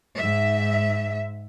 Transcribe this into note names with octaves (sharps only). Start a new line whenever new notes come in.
G#2 E5